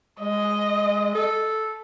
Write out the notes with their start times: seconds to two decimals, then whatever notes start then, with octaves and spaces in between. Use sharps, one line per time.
0.20 G#3 D#5
1.15 A4